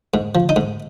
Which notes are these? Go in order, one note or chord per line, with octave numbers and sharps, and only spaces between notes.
G#2
F3
D#4
G#2